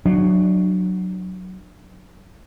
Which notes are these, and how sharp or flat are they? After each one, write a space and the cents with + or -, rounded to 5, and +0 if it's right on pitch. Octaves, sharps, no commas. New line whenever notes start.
F#3 +0 D4 +25